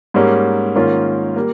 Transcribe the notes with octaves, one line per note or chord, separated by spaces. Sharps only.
G#2 G3 A#3 C#4
G#2 D#3 A#3 C#4 F4
G3 A#3